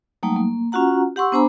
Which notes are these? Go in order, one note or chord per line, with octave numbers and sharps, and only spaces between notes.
F#3 G3 A3 A#3 D#4
A#3
C#4 F4 F#4 F#5 A#5
G4 F#5 C6 C#6 E6
B3 D4 C5 G#5 A#5 B5